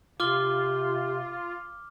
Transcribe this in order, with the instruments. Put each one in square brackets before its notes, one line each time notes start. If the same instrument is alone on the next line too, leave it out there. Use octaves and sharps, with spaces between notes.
[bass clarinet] C3 [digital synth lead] F4 [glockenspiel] D6 F6 G7